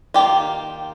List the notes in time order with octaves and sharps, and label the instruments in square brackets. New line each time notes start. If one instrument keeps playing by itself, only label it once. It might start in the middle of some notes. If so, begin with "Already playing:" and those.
[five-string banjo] D#3 G3 A#3 F4 G4